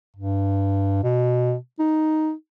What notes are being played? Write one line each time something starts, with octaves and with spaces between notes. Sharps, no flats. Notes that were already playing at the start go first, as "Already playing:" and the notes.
G2
B2
D#4